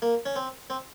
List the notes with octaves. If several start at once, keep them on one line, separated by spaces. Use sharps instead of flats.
A#3
C#4
C4
C4